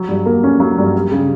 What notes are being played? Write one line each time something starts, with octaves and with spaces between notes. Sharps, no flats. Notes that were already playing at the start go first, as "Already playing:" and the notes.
Already playing: F#3
G2
A#3
C#4
F#3
G2
G3
C#3